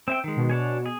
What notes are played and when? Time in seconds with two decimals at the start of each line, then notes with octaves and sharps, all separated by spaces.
0.08 C4 E5 G5
0.24 D#3 G#3
0.36 B2
0.50 D4 C#5 G#5
0.86 G#4